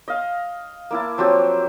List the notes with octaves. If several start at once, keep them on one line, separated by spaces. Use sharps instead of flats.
D#5 F5
A#3 E4 A5
F3 F#3 C4 G4